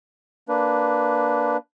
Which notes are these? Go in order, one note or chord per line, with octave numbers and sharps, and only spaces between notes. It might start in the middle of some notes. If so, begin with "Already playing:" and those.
A#3 D4 B4